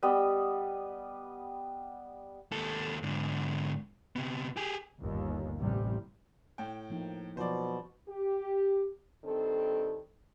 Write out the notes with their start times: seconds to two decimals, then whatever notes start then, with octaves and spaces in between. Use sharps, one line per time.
0.03 G3 B3 D#5
2.52 D#2 A4
3.03 G#2 D3
4.16 C3 B3
4.57 G4 G#4
5.00 G1 D#2
5.59 A1 C3 G3
6.58 A2 G5
6.90 F3 A#3 D#4
7.37 B2 F3 F#3 F4 C5 D5
8.08 G4
9.24 G2 D#3 C4 A4